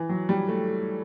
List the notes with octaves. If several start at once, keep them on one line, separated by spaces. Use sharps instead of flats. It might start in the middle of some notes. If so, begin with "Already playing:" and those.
Already playing: E3
F#3
G3
A3